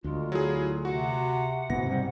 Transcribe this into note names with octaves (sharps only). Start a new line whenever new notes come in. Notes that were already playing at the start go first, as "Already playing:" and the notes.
D2 G#3 F4
F#3 E4 G#4
C3 F#4 F#5
F#1 G#2 B2 B3 A#6
C3 G3